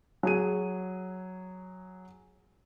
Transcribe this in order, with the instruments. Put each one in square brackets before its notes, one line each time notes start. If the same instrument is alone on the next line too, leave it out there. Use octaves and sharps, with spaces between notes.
[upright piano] F#3 G#4 D#7